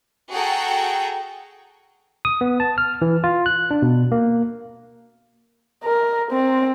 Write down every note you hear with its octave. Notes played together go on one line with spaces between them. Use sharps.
F#4 G#4 A4 F#5 G5 A#5
D#6
B3
A5
F6
E3
F4
F#6
D4
B2
A#3
A#4
C4